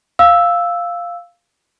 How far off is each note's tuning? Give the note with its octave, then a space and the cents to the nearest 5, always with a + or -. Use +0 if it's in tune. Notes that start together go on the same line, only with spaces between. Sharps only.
F5 +0 E6 +0